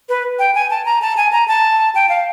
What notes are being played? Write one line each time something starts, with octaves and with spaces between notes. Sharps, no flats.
B4
G5
G#5
A5
A#5
A5
G#5
A#5
A5
G5
F5